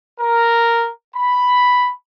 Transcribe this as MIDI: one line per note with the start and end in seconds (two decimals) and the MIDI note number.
0.20 0.87 70
1.16 1.92 83